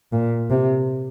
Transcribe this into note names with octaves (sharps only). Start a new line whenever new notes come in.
A#2
C3